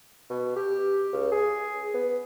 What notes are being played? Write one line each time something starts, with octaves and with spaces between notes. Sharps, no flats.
B2
G4
C#2
G#4
B3